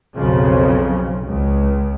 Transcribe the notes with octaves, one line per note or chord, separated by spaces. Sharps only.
B1 F2 C#3 F3
C#2